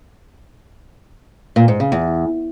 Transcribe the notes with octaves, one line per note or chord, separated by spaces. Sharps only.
A#2
G#2
C#3
E2